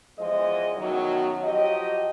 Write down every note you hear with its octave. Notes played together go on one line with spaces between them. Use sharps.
E2 E3 F3 G#3 D#5
F#2 B2 D#3 F#3
F3 F#3 G4 D#5